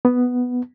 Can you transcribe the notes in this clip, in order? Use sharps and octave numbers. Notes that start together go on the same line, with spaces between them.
B3